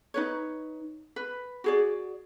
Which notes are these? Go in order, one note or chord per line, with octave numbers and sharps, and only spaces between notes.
D#4 B4 C#5
B4
F#4 G#4 D5